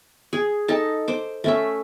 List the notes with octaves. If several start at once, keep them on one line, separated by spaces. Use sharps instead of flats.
G#4
D#4 A4 A5
C5 D6
A3 C#4 E5